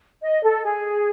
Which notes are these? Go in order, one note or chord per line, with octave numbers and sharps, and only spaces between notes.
D#5
A4
G#4